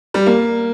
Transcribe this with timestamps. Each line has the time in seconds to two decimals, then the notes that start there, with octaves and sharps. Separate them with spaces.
0.14 G3
0.26 A#3